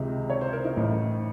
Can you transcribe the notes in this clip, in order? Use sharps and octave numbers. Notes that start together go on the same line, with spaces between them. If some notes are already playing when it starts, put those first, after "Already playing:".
Already playing: C#2 C3 D#3 D#4
C#5
C5
A#4
D#4
A1 A2